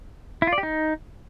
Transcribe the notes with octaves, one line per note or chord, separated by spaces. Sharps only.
E4
F4
D5
G4
D#4